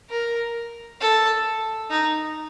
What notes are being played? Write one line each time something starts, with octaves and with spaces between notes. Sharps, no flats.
A#4
A4
D#4